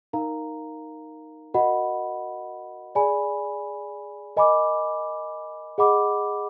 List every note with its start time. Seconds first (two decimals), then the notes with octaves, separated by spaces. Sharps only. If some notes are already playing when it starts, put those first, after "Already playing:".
0.13 D#4 A#4 F5 A#5
1.54 F#4 A#4 D#5 F#5 B5
2.95 G#4 D5 G#5 B5
4.37 A#4 D#5 G#5 B5 D6
5.78 G#4 D#5 F#5 B5 D6